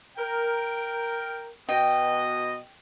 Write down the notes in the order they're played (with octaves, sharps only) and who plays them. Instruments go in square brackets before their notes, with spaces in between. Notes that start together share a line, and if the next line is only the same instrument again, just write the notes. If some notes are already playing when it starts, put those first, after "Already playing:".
[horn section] A#4 G5
[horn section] B2 D#5 [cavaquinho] G5